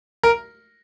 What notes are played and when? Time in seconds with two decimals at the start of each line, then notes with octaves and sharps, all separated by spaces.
0.23 A#4